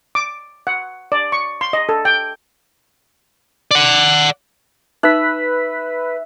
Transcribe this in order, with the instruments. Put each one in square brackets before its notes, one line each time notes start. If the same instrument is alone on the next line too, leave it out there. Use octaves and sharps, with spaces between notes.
[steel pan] D6
F#5
D5
C#6
C6
D#5
A4
G5
[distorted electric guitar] D5 F#5
[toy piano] D#4 [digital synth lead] B4 [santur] E5 [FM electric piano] F#6 B6